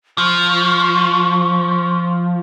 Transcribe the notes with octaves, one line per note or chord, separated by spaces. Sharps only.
F3 C#6